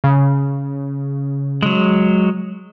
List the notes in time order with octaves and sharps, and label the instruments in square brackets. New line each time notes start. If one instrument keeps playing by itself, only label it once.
[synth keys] C#3
[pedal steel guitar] F#3 G#3